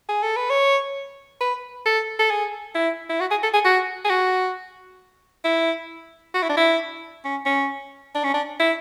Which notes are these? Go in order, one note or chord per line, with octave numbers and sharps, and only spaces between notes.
G#4
A4
B4
C#5
B4
A4
A4
G#4
E4
E4
F#4
G#4
A4
G#4
F#4
G#4
F#4
E4
F#4
E4
D4
E4
C#4
C#4
D4
C#4
D4
E4